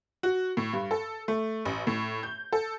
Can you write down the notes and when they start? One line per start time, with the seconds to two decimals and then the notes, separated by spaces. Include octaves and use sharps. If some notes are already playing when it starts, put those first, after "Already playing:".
0.23 F#4
0.57 A2
0.73 G2
0.91 A4
1.28 A3
1.65 A1
1.87 A2
2.23 G6
2.52 A4